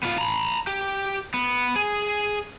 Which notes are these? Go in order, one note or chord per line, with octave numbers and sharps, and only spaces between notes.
B3 F4
A#5 B5
G4
B3
G#4